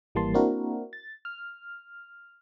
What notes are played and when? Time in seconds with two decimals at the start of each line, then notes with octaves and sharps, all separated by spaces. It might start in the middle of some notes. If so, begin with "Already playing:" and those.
0.15 G#1 E3 G3 A#3 A5 C6
0.34 A#3 C4 D4 E4 F#4 A#4
0.93 A6
1.25 F6